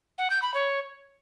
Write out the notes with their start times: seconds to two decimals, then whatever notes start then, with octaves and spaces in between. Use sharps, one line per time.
0.18 F#5
0.30 G6
0.42 B5
0.54 C#5